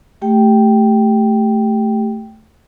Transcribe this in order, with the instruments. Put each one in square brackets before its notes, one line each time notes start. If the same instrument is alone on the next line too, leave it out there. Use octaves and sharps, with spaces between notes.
[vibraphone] A3 G4 G5